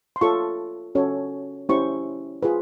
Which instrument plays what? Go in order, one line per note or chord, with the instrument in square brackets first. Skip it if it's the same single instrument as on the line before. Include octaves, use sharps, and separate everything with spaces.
[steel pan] C6
F4 A4 C#5 C#6
C#4 F#4 A4 C#5
C#4 E4 G4 C5 C#6
F4 G#4 B4